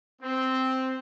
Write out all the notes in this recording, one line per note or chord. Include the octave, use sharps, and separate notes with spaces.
C4